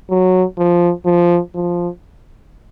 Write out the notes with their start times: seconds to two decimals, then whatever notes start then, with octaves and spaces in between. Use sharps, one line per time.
0.10 F#3
0.58 F3
1.06 F3
1.55 F3